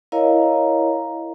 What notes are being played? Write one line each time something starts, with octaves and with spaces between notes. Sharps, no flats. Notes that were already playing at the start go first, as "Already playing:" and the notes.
E4 A#4 C#5 D#5 F5 A#5